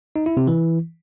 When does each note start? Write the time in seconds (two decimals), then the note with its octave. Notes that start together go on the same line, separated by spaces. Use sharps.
0.16 D#4
0.26 E4
0.37 C3
0.47 E3